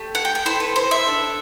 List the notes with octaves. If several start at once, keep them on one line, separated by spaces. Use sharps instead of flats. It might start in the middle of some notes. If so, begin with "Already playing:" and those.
Already playing: A3 G4
F#5
G5
G5
B3 E4 A4 C5
B4
C5
E5
D4 A4